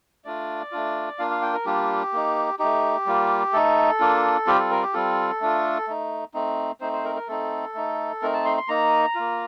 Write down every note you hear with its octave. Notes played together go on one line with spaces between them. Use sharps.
A3 D4 F4 D5
A3 D4 F4
A#3 D4 F4 F5
F5
G5
A#4
G3 A#3 D4 F4 G4
A#3 D#4
A3 D#4 G4
G3 A#3 F4
A3 D#4 A4
A#3 D4 F4
G3 C4 F4 G4
A4
A#4
G4
G3 C4 F4 A4
A3 D4 F4
A3 D#4
A3 C4 D#4
A3 C4 D#4 C5
C5
A#4
A#4
A3 C4 D#4 A4
A3 D#4
A3 C4 D#4 A#4
A5
C6
C6
A#3 D#4 A#5
A#3 F4